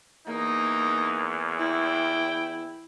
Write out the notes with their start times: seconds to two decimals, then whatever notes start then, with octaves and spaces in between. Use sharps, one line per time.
0.28 E2 A#3 D#4
1.59 E4 G5